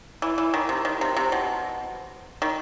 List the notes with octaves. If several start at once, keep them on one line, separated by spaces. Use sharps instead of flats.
E3
E3
D#3
C3
D#3
C3
C3
B2
D#3